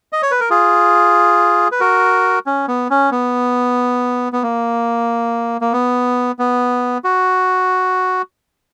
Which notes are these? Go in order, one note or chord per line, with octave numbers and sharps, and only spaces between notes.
D#5
C#5
B4
A#4
F4 G#4
B4
F#4 A#4
C#4
B3
C#4
B3
B3
A#3
A#3
B3
B3
F#4